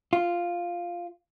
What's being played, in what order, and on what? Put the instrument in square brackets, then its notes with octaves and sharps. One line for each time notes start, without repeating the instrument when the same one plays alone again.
[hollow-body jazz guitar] F4